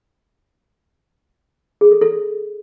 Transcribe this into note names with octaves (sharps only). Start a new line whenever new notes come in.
G#4
A4
A4